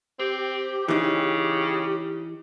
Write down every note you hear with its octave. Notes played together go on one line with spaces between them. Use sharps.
C4 G4
C#3 E3 D#4